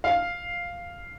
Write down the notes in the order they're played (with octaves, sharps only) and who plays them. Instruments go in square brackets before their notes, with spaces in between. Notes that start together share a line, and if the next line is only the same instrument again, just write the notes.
[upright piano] F5